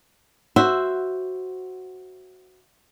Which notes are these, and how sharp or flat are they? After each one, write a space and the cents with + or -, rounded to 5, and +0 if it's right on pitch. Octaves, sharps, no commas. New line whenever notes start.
F#4 +5 C5 +0 E5 +0